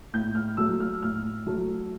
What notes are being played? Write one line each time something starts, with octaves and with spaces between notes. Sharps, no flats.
A2 G6
F6
F#3 A3 E6
F6
A2 F6
F#3 A3